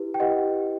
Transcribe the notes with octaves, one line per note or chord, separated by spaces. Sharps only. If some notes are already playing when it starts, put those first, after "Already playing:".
Already playing: E4 G4 B4
G5
E4 G4 B4 D#5 F#5